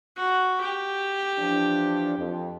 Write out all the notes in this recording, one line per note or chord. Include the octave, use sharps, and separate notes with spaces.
F#4
G4
E3 F3 D4
F2